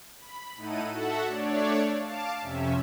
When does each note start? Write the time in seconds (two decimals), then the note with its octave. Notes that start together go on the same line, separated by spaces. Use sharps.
0.19 B5
0.56 A2 D#4 E4 A4 F#5 D#7
0.91 F#4 A4 E5 F#5
1.26 A3 D4 C#5 D5
1.96 F5 A5 D6
2.42 F2 C3 C#4 E5